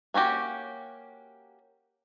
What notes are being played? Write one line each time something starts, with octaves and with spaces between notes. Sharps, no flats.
A#3 C#4 F#4 G4